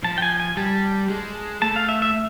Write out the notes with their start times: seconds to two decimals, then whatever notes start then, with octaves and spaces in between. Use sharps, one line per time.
0.04 F3 A5
0.18 G5
0.22 G#5
0.40 G#5
0.57 G3 A5
1.10 G#3
1.62 A3 A5
1.76 F5
1.89 E5
2.02 E5